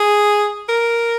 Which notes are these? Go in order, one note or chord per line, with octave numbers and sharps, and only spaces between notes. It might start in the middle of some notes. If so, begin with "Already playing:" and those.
Already playing: G#4
A#4